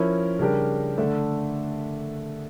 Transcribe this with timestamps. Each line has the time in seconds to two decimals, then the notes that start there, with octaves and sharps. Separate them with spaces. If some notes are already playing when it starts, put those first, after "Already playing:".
Already playing: F3 C#4 E4 A#4
0.39 C#3 G3 D4 G4 A#4
0.97 D3 A3 D4 A4 E5